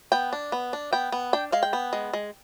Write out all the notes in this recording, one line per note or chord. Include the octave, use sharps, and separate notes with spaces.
B3 G5
D4
B3
D4
B3 G5
B3
D4 G5
G#3 F5
G5
B3
G#3
G#3